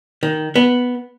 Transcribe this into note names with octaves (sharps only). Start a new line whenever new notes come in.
D#3
B3